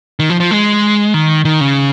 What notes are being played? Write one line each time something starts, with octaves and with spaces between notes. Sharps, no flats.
D#3
F3
F3
G#3
D#3
D#3
C#3